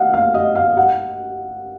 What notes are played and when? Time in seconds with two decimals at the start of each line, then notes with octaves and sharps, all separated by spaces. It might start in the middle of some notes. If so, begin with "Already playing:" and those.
Already playing: D#5 F5 F#5
0.13 F5
0.34 D#5
0.55 F5
0.77 F#5